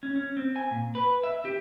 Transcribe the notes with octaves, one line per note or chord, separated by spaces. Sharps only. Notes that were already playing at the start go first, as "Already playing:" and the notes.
C#4
C#4
C4
G#5
A#2
B4
E5
G4